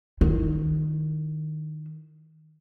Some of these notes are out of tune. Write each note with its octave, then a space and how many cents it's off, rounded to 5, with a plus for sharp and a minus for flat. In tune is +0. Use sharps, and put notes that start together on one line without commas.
D#3 -15 E4 +0